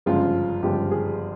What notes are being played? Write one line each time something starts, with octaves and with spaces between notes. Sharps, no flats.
G1 F#2 C#3 F3 G#3 F4
G1 F#2 C#3 F3 G#3 G4
G#4